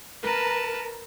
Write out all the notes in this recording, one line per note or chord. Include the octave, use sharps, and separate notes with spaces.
A#4 B4 A5